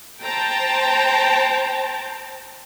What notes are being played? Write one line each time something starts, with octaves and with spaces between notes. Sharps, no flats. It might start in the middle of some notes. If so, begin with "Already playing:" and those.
C5 G5 A5 A#5